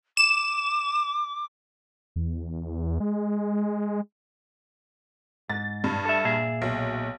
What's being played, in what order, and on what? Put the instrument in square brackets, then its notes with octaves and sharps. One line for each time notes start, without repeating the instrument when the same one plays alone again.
[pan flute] D6 [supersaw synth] E7
[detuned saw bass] E2
G#3
[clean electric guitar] G#2 [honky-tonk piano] A6
[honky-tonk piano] G2
[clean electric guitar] A4 E5
A#2 G#4 E5
[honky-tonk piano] B1